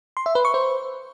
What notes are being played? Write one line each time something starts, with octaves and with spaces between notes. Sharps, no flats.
C6
E5
B4
C#6
C5